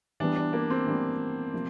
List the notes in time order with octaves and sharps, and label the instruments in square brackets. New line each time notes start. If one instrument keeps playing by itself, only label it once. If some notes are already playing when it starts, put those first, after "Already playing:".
[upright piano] E3 G3 B3 [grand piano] D4
[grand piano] D4
A#3
C4
[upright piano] E3 G3 B3
C3 F3 A#3